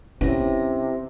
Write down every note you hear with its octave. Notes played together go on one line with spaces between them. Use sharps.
C3 B3 C#4 E4 A#6